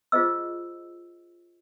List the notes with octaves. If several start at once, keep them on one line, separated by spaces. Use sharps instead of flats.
F4 G#4 C5 D#5 E6